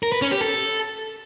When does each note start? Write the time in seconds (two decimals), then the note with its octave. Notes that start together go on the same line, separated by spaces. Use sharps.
0.03 A#4
0.12 B4
0.22 C#4
0.31 G4
0.41 A4